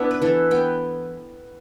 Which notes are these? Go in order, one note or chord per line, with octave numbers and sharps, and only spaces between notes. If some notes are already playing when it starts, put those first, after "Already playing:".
Already playing: B3 D4 E4
B4
E3 A4
B3 G5